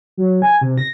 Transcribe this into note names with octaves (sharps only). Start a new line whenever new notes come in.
F#3
G#5
C3
A#6